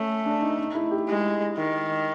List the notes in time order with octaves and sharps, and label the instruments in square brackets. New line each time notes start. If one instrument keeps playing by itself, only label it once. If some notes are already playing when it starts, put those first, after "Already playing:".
Already playing: [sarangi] A3 [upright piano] C#4
[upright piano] D4
D#4
D#4
E4
G4
[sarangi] G#3
D#3